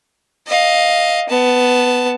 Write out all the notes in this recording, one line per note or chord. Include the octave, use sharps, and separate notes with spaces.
D#5 F5
B3 A5